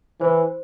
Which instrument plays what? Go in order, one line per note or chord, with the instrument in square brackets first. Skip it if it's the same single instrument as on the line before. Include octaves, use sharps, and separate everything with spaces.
[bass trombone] E3 [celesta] C5